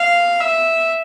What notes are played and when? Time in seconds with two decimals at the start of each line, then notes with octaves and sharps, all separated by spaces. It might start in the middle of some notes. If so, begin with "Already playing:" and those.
Already playing: F5
0.41 E5